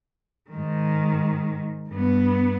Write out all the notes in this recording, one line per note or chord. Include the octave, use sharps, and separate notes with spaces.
G#2 D#3
G2 B3